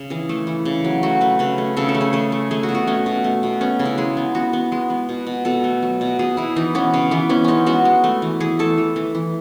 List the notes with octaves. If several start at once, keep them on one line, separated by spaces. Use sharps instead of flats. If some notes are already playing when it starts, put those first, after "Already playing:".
Already playing: C#3
E3 G#4
A3 A4
E3
C#3
F#3
A3 F#4
A3 B4
C#3 B4
A3
C#3 A4
A4
A3
G#4
A3 G#4
A3
A3 G#4
F#4
B2
F#4
A3 C#4
B2
A3
B2
B3 C#4
C#3
E4
G#3 G#4
B3
B3 F#4
B3
G#3
B3
B2
B2
B2 A4
A3
F#3
B2
B2 G#4
B2 E4
E3 D#4
B3 C#4
C#3 C#4
E3 B3
B3 C#4
G#3 C#4 D#4
B3 F#4
G#3
A3
E3
E3 G#4
A3 A4
E3
E3
E3